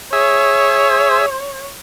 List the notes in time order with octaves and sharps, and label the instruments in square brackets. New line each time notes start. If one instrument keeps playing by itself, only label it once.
[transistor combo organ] G#4 E5 [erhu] C#5